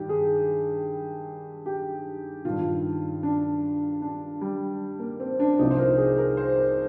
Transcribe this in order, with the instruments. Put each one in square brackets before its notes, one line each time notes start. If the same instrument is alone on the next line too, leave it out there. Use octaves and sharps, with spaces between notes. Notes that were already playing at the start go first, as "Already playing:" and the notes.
Already playing: [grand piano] G2 D#3 G4
G#4
G4
G2 D#3 F4
D4
D4
G3
A#3
C4
D4
C2 C3 F3 D#4
C5
A#4
G#4
A#4
C5
A#4